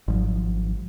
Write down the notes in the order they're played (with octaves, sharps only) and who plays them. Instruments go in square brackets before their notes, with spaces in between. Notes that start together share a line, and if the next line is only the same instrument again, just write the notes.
[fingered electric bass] G#1 F3 F#3